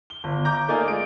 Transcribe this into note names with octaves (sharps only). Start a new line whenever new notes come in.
G7
G1
A#5 D6 G6
A3 A#3 D#4 F4 D5 G#5
G#3 D7